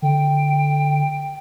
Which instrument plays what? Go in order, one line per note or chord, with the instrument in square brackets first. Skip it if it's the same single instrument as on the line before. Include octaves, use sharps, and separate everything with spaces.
[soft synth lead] D3 [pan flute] G5